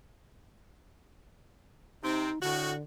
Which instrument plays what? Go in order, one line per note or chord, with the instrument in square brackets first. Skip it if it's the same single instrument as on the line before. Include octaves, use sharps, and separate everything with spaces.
[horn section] C3 C4 [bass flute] D#4
[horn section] A2 F#4 [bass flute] D3